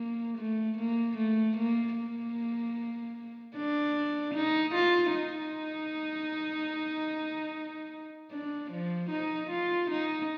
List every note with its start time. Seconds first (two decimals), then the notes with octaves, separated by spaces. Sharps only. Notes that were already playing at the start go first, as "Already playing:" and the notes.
Already playing: A#3
0.38 A3
0.78 A#3
1.18 A3
1.58 A#3
1.97 A#3
3.56 D4
4.35 D#4
4.75 F4
5.15 D#4
8.31 D4
8.72 F3
9.11 D#4
9.51 F4
9.91 D#4